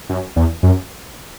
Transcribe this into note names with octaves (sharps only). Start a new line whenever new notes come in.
F#2
E2
F#2